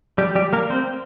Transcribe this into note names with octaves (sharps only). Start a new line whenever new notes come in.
G3 G4
G3 G4
A#3 A#4
C4 C5